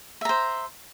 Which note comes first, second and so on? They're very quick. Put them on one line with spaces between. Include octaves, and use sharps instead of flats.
E5 A#5 C5